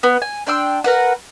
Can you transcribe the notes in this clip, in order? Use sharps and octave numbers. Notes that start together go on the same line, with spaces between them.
B3
G#5
D4 G5 C6 E6
A#4 B4 F#5